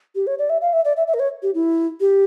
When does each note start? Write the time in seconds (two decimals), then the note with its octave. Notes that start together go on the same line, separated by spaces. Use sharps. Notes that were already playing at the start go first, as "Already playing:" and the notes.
0.15 G4
0.27 C#5
0.39 D5
0.50 E5
0.61 F5
0.73 E5
0.85 D5
0.97 E5
1.07 E5
1.14 A#4
1.20 C#5
1.43 G4
1.54 E4
2.00 G4